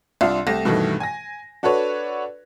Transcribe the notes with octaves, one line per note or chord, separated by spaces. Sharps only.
C2 D4 F4 E5 C6
C2 A3 G4 A#6 E7
G2 B2 D#3 E3 A3
G#5 A#6
D4 F#4 A4 B4 C#5